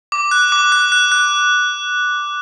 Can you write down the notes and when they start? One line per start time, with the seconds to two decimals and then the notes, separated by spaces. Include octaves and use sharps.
0.12 D6
0.31 F#6
0.52 D6
0.72 F#6
0.92 F#6
1.12 F#6